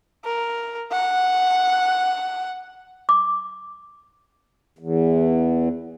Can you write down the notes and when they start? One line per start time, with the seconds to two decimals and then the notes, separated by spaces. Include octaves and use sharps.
0.25 A#4
0.92 F#5
3.09 D6
4.79 E2